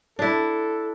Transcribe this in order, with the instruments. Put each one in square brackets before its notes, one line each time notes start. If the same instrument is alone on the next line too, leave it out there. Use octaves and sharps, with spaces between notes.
[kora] D4 E4 [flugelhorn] A4